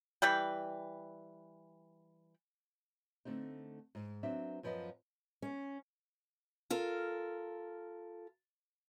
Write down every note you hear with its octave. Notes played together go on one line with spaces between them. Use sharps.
E3 G3 B4 G5
D3 A3 C4 D#4
G#2
F#3 B3 C4 D4 E5
F#2 F3 B3 B4 D#5 F5
C#4
F4 A4 A#4